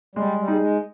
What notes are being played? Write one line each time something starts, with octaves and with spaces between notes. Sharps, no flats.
G3 G#3
G3
D#4 G#4
G#3